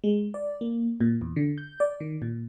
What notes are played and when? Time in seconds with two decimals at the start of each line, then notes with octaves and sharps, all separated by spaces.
0.04 G#3
0.34 D5
0.61 A#3
1.00 A#2
1.21 E2
1.36 D3
1.58 G6
1.80 D5
2.00 D#3
2.22 A#2